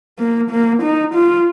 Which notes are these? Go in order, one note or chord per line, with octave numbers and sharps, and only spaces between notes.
A#3
A#3
D#4
F4